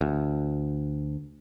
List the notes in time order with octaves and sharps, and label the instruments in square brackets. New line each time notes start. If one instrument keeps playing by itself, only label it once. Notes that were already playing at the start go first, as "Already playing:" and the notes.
[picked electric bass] D2